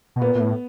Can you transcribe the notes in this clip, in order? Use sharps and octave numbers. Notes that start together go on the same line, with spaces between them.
B2
A#2 B3
A#2
A2